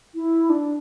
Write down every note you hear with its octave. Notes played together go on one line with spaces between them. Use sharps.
E4
D4